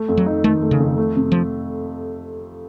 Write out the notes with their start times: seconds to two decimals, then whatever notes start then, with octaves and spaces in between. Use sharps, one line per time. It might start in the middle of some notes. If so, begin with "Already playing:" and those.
Already playing: A3
0.08 F2
0.17 F#3
0.26 D#4
0.44 D#3 A3
0.62 A3
0.71 C#3
0.80 F2
0.98 A3
1.16 C3
1.32 F3